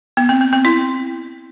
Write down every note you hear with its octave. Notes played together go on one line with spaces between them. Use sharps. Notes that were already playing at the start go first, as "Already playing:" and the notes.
B3
C4
C4
C4
E4